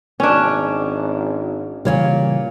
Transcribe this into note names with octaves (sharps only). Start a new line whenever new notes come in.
G#1 C#4 D4
A#2 C#3 E3 G3 C#5 F5